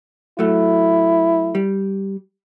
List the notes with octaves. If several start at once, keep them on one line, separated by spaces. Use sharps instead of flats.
F#3 A3 E4
G3